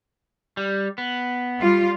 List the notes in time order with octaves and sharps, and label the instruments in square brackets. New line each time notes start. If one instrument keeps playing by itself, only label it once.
[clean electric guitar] G3
B3
[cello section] G3 F4